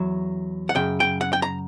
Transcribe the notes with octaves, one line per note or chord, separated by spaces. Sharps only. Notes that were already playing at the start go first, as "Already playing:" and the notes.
Already playing: E2 F#3
F#5
F#2 C#3 G5
G5
F#5
G5
A#5